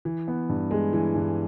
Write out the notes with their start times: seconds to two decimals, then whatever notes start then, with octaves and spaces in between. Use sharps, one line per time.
0.05 E3
0.28 B3
0.49 G2
0.71 G#3
0.93 E3
1.15 G2